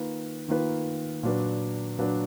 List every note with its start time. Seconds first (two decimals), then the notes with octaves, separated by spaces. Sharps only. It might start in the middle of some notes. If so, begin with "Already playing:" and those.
Already playing: D#3 A#3 F4 B4
0.48 D#3 A#3 F4 B4
1.23 A#2 F#3 D4 F#4 B4
1.98 A#2 F#3 D4 F#4 B4